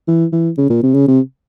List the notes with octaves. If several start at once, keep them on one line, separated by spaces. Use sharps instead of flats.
E3
E3
C#3
A#2
C3
C#3
C3